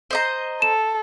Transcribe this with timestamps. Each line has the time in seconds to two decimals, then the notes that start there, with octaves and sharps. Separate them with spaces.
0.11 C5 D#5 A#5
0.62 A4 E7